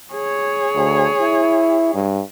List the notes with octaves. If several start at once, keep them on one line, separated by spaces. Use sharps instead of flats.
G#4 C#5
D2
E4
G2